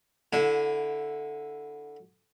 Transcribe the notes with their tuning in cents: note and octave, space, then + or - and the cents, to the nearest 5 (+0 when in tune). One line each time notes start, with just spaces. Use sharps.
D3 +0 E4 +0 F#5 -35